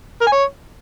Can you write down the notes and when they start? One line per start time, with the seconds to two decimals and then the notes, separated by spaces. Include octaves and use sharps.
0.21 A#4
0.27 G#5
0.32 C#5